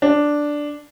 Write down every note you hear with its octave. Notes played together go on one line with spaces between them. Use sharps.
D4